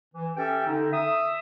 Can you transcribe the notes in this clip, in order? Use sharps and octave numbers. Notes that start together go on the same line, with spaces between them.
E3
C#4 G4 A4 E5 G5
D3 D#4
E5 D#6